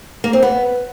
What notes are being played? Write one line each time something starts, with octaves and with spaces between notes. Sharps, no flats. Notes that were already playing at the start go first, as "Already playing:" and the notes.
A#3
C4
B3